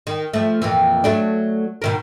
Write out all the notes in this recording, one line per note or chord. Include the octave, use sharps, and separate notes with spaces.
D#3
F3 A3
F2 A#2 E3
F#3 A3 D4
B2 D#3 A#4